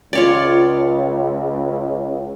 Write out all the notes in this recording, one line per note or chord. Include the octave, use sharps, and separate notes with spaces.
C#2 F4 C#5 D5